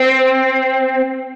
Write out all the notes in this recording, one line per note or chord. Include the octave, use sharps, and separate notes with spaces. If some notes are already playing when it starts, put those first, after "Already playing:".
Already playing: C4